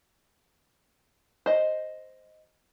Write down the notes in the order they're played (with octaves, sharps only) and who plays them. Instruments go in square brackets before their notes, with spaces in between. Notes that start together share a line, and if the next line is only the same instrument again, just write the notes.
[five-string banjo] C5 D#5